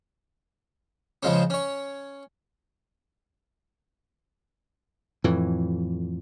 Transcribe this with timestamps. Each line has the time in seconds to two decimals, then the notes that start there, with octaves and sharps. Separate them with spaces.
1.23 C#3 F3 G#3 C#4
1.50 C#4 C#5
5.24 F2 A2 E3